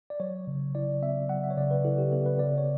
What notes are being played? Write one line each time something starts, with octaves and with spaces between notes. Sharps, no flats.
D5
F#3 C#5
C#3
E4 D5
B3 E5
F#3 F#5
E5
C#5
C#3 D5
B4
E4 A4
G4
B3 A4
B4
C#3 D5
C#5